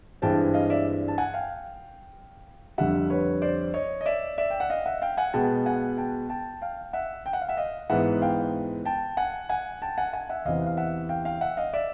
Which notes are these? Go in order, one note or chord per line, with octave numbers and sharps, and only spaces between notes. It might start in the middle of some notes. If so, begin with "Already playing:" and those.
G2 E3 G#3 C4 G5 A5
D#5 F5
D5 E5
A5
F#5 G#5
F5 G5
F2 D3 G3 E5 F#5
B4 C#5
C5 D5
C#5 D#5
D#5
D5 E5
D5 E5
G5
F#5
D#5 F5
E5 F#5
F5 G5
F#5 G#5
B2 G#3 B3 G5 A5
F#5 G#5
G5 A5
G5 A5
F5 G5
E5 F#5
G5
F#5
F5
E5 F#5
D#5 F5
G#2 E3 G#3 B3 E5 F#5
F5 G5
G5 A5
F#5 G#5
F#5 G#5
G5 A5
F#5 G#5
F#5 G#5
E5 F#5
E2 C3 E3 D#5 F5
F5
E5 F#5
F5 G5
F5 G5
E5 F#5
D#5 F5
D5 E5